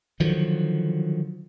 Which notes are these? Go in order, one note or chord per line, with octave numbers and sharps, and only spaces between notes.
D3 D#3 F3 F#3